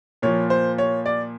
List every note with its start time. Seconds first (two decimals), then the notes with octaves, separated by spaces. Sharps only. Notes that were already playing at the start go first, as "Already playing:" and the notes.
0.22 A#2 F3 C#5
0.50 C5
0.78 C#5
1.06 D5